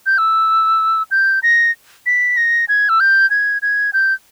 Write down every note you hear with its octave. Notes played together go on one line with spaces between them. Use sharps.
G6
E6
G6
A#6
B6
A#6
G#6
E6
G6
G#6
G#6
G6